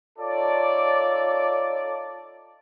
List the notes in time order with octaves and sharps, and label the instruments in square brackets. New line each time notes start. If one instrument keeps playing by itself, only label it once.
[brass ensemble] D#4 F4 A4 C#5 D5